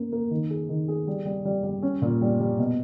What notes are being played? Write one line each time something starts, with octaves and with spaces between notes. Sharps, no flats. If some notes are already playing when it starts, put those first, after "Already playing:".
Already playing: A#3 C#4
A#3
D#3
G#4
D#3
G#4
G3
G3
G3
G3
C#4
A#2
G3
G3
B2